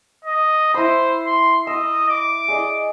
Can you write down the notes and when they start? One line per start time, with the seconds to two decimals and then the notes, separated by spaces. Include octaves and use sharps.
0.25 D#5
0.74 E4 C5 B5
1.26 C6
1.67 D#5 E6
2.09 D6
2.48 G#4 D5 D#5